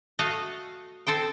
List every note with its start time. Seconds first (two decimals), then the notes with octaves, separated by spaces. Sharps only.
0.19 A3 F#4 D#5 F5
1.07 C4 A4 C5 G5